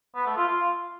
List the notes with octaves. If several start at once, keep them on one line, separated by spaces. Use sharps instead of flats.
B3
A3
F4
F4